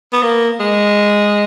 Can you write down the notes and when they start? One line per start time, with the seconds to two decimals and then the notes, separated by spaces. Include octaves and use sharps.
0.13 B3
0.23 A#3
0.60 G#3